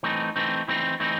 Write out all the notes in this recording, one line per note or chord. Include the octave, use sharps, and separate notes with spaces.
E3 A3 C4 D#4
E3 A3 C4 D#4
E3 A3 C4 D#4
E3 A3 C4 D#4